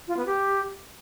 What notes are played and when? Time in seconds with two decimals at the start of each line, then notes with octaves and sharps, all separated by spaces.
0.07 F4
0.17 B3
0.26 G4